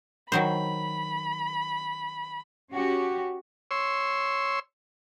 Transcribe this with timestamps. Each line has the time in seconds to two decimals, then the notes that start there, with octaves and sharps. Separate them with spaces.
0.32 D#3 F#3 C5 B5
2.74 C#4 F#4 G4
3.71 C#5 C6 E6